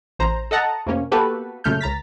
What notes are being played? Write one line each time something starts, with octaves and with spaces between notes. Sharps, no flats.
A1 C5 A#5
A4 D#5 F#5 A5 A#5
F2 C3 A#3 C#4
A#3 B3 F#4 G4 A4 B4
F#2 A#2 C#3 A3 F6 G6
C#2 A#5 A6 B6